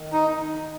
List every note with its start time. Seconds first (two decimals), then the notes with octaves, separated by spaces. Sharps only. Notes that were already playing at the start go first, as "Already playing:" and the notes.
Already playing: D#3
0.13 D#4